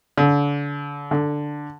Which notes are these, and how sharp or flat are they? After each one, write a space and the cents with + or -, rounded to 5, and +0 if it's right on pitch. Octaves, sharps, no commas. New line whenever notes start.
D3 -30
D3 +5